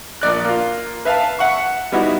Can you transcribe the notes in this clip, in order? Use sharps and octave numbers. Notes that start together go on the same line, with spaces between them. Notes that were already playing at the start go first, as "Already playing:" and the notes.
A#1 D5 F#6
A#3 F4
B4 E5 F5 A5
E5 F#5 C#6
G3 B3 D#4 E4 F#4